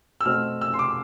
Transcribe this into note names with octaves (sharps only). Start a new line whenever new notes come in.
E6
B2 A3 C4 F6
E6
C6
D6